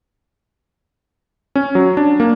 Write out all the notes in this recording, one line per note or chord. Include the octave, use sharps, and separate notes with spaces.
C#4
F#3
D4
A#3